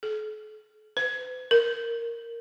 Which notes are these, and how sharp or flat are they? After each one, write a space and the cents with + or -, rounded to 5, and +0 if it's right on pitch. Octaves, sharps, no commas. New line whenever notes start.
A4 -45
B4 +45
A#4 -5